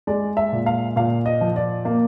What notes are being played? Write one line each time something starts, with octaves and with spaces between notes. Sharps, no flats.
G#3 D5
E5
A#2
F5
A#2 F5
D#5
F3
D5
A#3